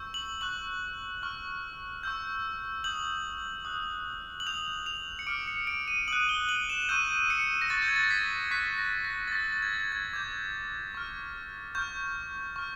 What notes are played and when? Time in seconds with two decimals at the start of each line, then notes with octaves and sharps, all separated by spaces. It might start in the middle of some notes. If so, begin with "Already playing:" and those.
Already playing: C#6 E6 G6
0.14 F#7
0.41 C#6 F#6 F#7
1.22 C#6 F6
2.03 C#6 E6 G6
2.84 D#6 G6 F#7
3.65 D#6 F#6
4.40 F#7
4.46 D#6 G6 F7
4.86 F7
5.19 C#7
5.27 D6 F6 D7
5.48 C#7
5.67 D7
5.88 D#7
6.08 D#6 F#6 F#7
6.29 G7
6.49 F#7
6.70 E7
6.89 C#6 E6 G6 D#7
7.30 C#7
7.61 A#6
7.70 C#6 F#6 A6
7.82 G6
7.88 G#6
7.96 A6
8.04 A#6
8.10 B6
8.51 C#6 F#6 B6
8.78 A#6
9.05 A#6
9.28 A6
9.32 C#6 E6 G6 A#6
9.52 A6
9.62 G#6
9.73 A6
9.92 G#6
10.13 D6 G6 G#6
10.95 C#6 F6
11.75 C#6 F6 G6
12.56 C#6 F6